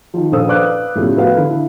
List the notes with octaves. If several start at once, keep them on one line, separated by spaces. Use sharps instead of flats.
D#3 F3
A#1 A4 C5 F5 D#6 E6
B4 D5 F5 D6 F#6
A2 C#3 F3 G3 B3
F#4 A4 B4 F5
D3 E4